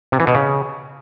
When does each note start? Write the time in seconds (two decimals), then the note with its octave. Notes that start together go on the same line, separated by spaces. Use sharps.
0.12 C3
0.20 E3
0.27 B2
0.35 C#3